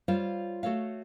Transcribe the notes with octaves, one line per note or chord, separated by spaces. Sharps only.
G3 F4 C5 C#5 F5
A3 F#4 A4 C#5 F5